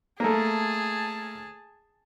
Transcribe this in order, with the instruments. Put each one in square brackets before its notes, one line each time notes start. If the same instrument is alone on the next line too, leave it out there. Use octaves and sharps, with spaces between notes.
[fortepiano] A3 A#3 [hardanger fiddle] G#4 A5